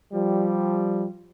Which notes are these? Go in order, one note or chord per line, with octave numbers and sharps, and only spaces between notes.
F3 G3